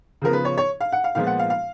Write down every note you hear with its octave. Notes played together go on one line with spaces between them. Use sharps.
C#3 F3 B3 A#4
B4
C#5
C#5
F5
F#5
F5
A#2 F3 G#3 B3 F5
F#5
F5
F5